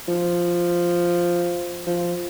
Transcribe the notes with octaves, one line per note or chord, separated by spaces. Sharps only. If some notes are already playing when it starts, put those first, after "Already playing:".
F3
F3